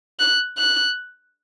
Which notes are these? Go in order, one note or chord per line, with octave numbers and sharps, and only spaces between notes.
F#6
F#6